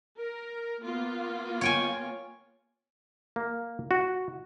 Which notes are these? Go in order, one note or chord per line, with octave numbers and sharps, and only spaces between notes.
A#4
A#3 B3 F4
C#5 G5 G#5
A#3
F#4